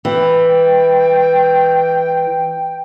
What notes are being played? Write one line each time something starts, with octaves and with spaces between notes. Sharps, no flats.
E3 G5